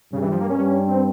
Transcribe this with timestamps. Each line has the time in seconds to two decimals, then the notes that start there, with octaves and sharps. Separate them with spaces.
0.12 G2 C#3 G3
0.22 E3
0.32 F3
0.41 A#3
0.50 G2 G3 C#4
0.88 C4